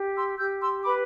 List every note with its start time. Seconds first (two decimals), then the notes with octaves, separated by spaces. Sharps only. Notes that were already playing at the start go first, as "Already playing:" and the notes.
Already playing: G4
0.16 C6 E6
0.38 G4 E6 G6
0.61 C6 E6
0.83 B4 B5 D6